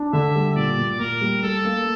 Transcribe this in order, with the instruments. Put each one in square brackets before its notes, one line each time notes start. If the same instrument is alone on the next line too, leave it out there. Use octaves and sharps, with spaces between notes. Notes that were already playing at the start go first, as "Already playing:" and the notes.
Already playing: [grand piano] D4
[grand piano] D3 [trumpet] E5
[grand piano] G3
[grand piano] A#2 [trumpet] D5
[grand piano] A#2
[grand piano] A#2 [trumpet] A#4
[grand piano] G3
[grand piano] G3 [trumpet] A4
[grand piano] A#3